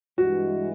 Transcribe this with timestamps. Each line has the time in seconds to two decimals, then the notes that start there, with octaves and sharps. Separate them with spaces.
0.18 G2 E3 G#3 F#4